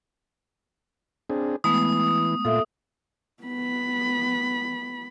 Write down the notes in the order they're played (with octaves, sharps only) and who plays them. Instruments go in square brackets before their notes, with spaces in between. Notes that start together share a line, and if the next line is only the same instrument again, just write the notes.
[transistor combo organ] C4 D4 G#4
[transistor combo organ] E3 [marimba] G#3 A3 B3 [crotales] D#6
[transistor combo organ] A#2 F4 [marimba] A4 E5
[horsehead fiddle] B3 B5